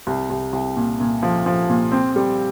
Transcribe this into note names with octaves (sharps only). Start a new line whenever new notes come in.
C2
C2
C2
A#2
A#2
F3
F3
A#2
C4
G3